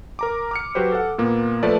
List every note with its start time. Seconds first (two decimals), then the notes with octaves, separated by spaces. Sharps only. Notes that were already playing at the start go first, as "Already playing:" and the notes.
0.19 A#4 A#5 D6
0.51 D6 F6 C#7
0.75 F#3 F#4 G4 B4 C5
0.92 A4 F#5
1.18 A#2 A#3 B3
1.63 F3 A3 A4 B4 D5